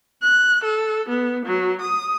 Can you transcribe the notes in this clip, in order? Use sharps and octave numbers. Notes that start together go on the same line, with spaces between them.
F#6
A4
B3
F#3
D#6